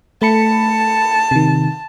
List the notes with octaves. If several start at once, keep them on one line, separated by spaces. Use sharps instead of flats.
A3 A5 B5 C#7
C3 D#3